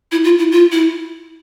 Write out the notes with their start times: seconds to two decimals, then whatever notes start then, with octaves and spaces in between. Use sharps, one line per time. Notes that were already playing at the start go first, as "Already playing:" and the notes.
0.12 E4
0.24 F4
0.38 E4
0.52 F4
0.72 E4